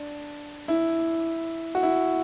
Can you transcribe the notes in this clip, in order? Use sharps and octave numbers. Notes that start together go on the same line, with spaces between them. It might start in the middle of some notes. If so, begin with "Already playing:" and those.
Already playing: D4
E4
F#4
E4